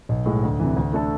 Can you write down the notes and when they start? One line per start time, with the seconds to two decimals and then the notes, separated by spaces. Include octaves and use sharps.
0.09 B1
0.26 A2 G#3
0.43 D2
0.60 C3 E3
0.77 D2
0.93 D3 A3 D4 A4